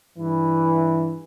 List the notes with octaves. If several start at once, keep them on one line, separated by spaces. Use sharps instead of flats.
G2 E3